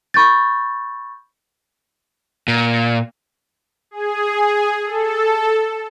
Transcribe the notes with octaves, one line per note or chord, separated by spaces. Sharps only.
B5 C#6 G6 A6
A#2
G#4
A4